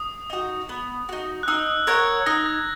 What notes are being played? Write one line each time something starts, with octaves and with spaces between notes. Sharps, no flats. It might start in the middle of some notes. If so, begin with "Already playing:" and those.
Already playing: D#6
D#4 F#4
B3
D#4 F#4
F#6
D#4 E6
A#4 C#5 F#5 G#6
D#4 A#6
G#6